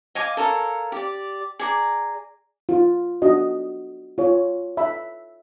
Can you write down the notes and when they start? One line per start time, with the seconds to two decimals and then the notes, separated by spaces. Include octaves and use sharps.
0.15 D#5 F5 G#5 D6
0.37 A4 A#4 C#5 F5
0.92 G4 D5
1.59 G#4 D5 A#5
2.69 F4
3.22 D4 F#4 D#5
4.18 F4 C#5
4.77 E5 B5